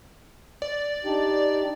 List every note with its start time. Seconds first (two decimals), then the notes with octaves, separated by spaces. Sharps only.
0.62 D5
1.05 D4 D#4 G4